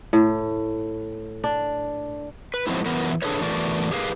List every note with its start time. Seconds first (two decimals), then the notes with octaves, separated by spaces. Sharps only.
0.13 A2
1.44 D4
2.54 B4
2.67 F3 F#3 G#3 B3 C4 E4
2.86 E3 F#3 B3 A#4
3.22 D4 G#4 A4 B4 C#5
3.41 E2 E3 A3 F#4 A#4 D5
3.92 G4 G#4 A#4 B4 F5